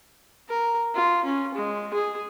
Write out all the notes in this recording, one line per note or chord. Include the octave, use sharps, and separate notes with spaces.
A#4
F4
C#4
G#3
G#4